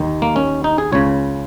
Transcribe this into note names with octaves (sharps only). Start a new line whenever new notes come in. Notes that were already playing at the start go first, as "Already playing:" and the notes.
Already playing: D#2 D#3
A#3
C#4
D#4
G#4
C#2 C#3 C#5